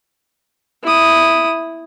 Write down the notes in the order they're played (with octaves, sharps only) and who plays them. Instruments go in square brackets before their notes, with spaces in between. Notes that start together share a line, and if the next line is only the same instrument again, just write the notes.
[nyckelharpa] E4 D#6